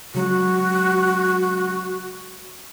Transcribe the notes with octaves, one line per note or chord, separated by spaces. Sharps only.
C#3 F#3 G#3 F#4